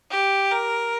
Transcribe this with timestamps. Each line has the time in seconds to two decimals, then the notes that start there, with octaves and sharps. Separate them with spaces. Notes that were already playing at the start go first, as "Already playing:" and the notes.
0.10 G4
0.51 A#4